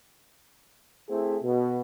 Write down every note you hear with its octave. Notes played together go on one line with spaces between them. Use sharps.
A3 C4 E4 G#4
B2